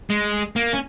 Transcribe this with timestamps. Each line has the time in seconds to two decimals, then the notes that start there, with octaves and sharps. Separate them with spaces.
0.10 G#3
0.56 A#3
0.73 C#4